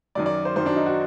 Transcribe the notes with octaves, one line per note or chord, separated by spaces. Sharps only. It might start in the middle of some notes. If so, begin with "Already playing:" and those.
F#2 D#3 F#3 D5
D5
C5
F#2 D#3 F#3 C5
D4
D#4
F#4